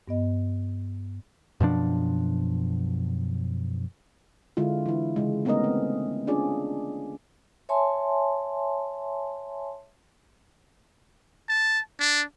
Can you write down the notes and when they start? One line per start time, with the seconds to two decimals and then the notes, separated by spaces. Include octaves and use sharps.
0.08 G2 B3 D#5
1.60 F#2 B2 F3 D4
4.57 D3 G#3 E4 F4
4.86 E3 E4
5.16 C#3 G#3
5.45 A3 B3 C#4 D#4 A#4 D#5
5.64 C4
6.27 C#4 D4 F4 G#4 D5
7.69 C#5 E5 G#5 A5 C6
11.48 A5
11.99 D4